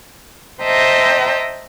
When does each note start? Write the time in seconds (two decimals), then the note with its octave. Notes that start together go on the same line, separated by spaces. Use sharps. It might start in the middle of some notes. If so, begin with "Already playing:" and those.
0.62 C5 D#5 E5 G5 A5 A#5